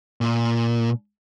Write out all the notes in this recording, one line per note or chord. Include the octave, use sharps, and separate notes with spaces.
A#2